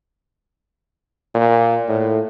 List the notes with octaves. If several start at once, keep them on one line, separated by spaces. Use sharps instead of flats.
A#2
A2